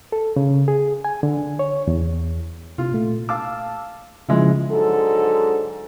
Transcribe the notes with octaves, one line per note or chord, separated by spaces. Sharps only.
A4
C#3
G#4
G#5
D3
C#5
E2
C3 F4
A#2 A3
F5 A5 D6 E6
C#3 F3 G#3 E4
G#2 D3 F#3 A4